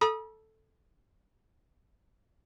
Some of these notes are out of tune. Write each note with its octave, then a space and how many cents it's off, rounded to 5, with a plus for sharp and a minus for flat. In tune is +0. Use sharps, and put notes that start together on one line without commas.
A4 +0 B5 -45 D#6 -10